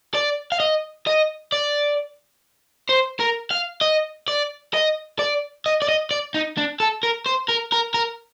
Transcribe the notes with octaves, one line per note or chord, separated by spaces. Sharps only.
D5
F5
D#5
D#5
D5
C5
A#4
F5
D#5
D5
D#5
D5
D#5
D5
D#5
D5
D#4
D4
A4
A#4
C5
A#4
A#4
A#4